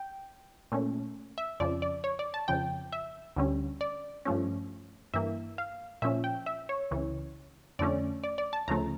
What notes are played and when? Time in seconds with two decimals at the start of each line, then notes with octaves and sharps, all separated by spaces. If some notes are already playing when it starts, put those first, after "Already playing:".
Already playing: G5
0.72 A#2 A3 C#4
1.38 E5
1.60 F2 C#3 F3 D5
1.82 D5
2.04 C#5
2.19 D5
2.34 A5
2.48 F2 C#3 F3 G5
2.93 E5
3.36 D2 D3 G3 C#4
3.81 D5
4.25 G2 F3 A3 C#4
5.14 G2 E3 A#3 E5
5.58 F5
6.02 A#2 F3 C#4 E5
6.24 G5
6.46 E5
6.69 C#5
6.91 C#2 C#3 E3
7.79 F2 D3 A3 C#4 D5
8.24 D5
8.38 D5
8.53 A5
8.68 D2 C#3 F3 A3 A#5